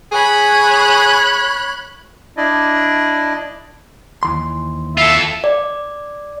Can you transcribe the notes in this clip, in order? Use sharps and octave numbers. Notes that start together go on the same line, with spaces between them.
G#4 C#5 B5 F#6
D4 E4 D5 D#5
D#2 E3 C6
F4 A4 E5
D5